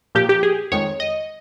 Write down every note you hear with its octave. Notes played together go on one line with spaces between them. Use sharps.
A#2 F3 A#3 G4
G4
G#4
F2 D#3 G#3 C#5
D#5